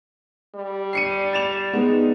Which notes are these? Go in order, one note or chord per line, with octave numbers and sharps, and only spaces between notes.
G3
C7 C#7 D#7
A6 E7 F7
G#3 B3 D#4